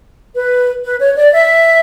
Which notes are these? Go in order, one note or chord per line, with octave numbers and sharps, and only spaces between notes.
B4
B4
C#5
D5
E5